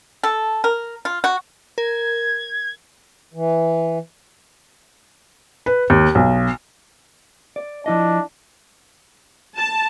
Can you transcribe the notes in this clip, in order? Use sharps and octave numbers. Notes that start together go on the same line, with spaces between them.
A4
A#4
F4
F#4
A#4 G#6
E3
B4
D#2
B1
D5
F3 D4 E4 D#5
A5